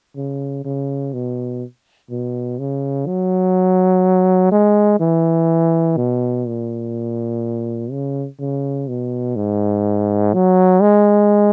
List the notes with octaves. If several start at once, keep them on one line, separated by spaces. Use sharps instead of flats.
C#3
C#3
B2
B2
C#3
F#3
G#3
E3
B2
A#2
C#3
C#3
B2
G#2
F#3
G#3